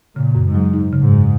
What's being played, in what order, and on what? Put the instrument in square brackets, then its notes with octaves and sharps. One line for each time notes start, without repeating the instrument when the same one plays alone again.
[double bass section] A#2 [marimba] C#3
[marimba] F#2
[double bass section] G#2
[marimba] F#3
D#4
C#3
[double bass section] G#2
[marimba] F#2